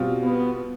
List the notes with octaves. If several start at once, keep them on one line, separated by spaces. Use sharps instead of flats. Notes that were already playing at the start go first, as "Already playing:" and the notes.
Already playing: B2 G3 C4 F4
B3